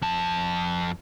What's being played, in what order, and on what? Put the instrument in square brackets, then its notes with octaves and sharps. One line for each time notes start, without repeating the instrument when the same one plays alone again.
[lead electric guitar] F2 A5